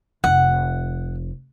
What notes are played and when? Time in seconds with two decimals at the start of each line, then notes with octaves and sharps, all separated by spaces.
0.24 F1 F#5